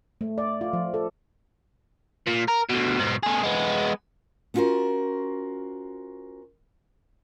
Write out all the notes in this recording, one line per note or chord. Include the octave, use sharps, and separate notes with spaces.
A3
D5
F4
F3
A4
A#2
A#4
D2 B2
G#2 B2
A3 G#4
G#3 B3
B3 C#4 F4 F#4 A#4 C5